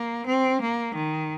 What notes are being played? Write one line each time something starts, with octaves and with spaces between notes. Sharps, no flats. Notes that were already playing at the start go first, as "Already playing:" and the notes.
Already playing: A#3
C4
A#3
D#3